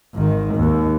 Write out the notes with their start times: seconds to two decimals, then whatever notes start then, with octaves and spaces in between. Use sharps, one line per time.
0.15 G#1 D#3
0.55 D#2